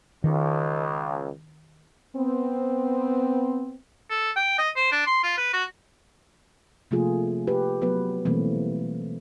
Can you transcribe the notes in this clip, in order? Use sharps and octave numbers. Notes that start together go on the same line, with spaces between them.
C#2 D#3
B3 C4
A4
G5
D#5
C5
D4
C6
F4
B4
F#4
C3 F3 A3 A#3 F4 G#4
G4 B4
F#3 B3 B4
B2 E3 G3 A3 A#3 C4